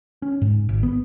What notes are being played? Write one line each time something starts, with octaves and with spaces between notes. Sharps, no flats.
C#4
G#2
G#1
B3